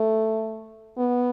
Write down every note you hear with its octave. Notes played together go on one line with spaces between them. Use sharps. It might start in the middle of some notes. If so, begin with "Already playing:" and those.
Already playing: A3
B3